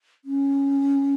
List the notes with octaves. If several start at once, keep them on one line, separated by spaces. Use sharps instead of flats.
C#4